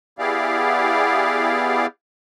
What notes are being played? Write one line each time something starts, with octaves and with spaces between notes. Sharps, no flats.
B3 E4 G4 G#4 D5 F5